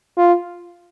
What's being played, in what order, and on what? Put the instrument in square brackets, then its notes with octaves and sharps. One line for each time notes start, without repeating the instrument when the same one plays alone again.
[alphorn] F4